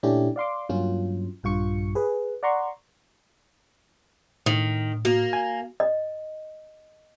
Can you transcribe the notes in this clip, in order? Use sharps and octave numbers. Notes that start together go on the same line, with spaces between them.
A#2 A3 C#4 D4 E4 G4
D5 F5 C6 D6
G2 F#3 A#3 C#4 F4
A#1 G2 F4 C#6 C#7
G#4 B4
D5 F#5 A#5 C6 C#6
A2 D#3
A#3 F#4
G#5
D#5